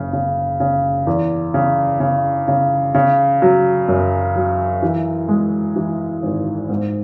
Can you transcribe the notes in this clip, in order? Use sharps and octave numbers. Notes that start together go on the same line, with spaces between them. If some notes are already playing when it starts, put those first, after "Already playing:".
Already playing: F#1 C#3
C#3
C#3
E2
C#3
C#3
C#3
C#3
F#3
F#2
F#3
E3
G#3
E3
G#1
G#2